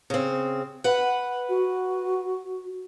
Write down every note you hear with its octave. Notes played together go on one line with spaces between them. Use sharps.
C#3 C4
B4 F#5
F#4